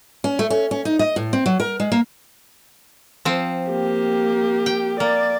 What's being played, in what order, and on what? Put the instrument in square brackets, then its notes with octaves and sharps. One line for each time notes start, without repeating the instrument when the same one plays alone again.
[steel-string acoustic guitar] C#4
A3
C#4
C#4
D#4
D#5
A2
C4
F#3
A#4
G#3
A#3
[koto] F3 C4
[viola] A#3 G4
[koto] G5
[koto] A#3 [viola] D5